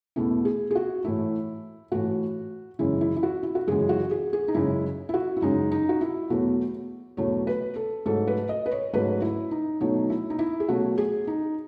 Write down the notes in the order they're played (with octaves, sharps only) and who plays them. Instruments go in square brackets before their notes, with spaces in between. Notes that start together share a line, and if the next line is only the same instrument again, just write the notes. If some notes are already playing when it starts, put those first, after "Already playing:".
[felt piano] E2 B2 A3 E4
G#4
G#4
F#4
A2 E3 A3 E4
A2 E3 A3 F#4
F#2 C#3 E3 G#3 E4
E4
E4
F#4
E4
F#4
F#2 C#3 E3 G#3 G#4
F#4
G#4
G#4
D#4
F#2 C#3 G#3 E4
E4
F#4
E4
F#2 C#3 G#3 D#4
D#4
F#4
E4
E2 B2 F#3 A3 F#4
E2 B2 F#3 A3 C#5
B4
A4
G#2 F#3 A3 A4
B4
D#5
B4
C#5
G#2 F#3 A3 B4
E4
D#4
B2 F#3 A3 D#4
E4
D#4
E4
G#4
B2 F#3 A3 F#4
G#4
D#4